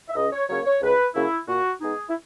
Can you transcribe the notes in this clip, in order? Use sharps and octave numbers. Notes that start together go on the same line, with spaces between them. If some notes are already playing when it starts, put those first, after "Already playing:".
E5
C#2 D#5
C#5
C#3 F#3 A#3 C#5
C#5
C#2 B4
C#3 F#3 A#3 E4
A#2 F#4
G#3 B3 D#4 G#4
E4